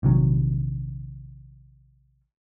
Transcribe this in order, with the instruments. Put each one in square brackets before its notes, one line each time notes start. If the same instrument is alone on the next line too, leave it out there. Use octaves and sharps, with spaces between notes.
[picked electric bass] A#1 C3 D#3 F#3